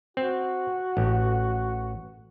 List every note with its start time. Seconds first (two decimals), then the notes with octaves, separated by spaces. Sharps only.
0.17 C4 F#4
0.97 A1